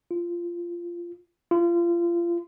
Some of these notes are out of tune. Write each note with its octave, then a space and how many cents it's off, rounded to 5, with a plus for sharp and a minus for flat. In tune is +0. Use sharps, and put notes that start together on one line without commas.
F4 -15
F4 -30